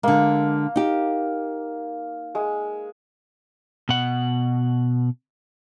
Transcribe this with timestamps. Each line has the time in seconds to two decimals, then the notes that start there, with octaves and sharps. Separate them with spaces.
0.03 D3 G#3 A#3
0.76 D#4 G4
2.35 G#3
3.89 B2 F#5